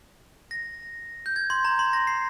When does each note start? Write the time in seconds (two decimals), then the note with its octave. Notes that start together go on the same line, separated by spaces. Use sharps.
0.51 A#6
1.26 G6
1.36 G#6
1.50 C6
1.65 A#5
1.79 C6
1.93 A#6
2.07 C7